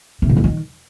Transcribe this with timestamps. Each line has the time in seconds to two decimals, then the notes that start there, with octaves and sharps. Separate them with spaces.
0.22 C3
0.29 G#2
0.37 F2
0.44 D#3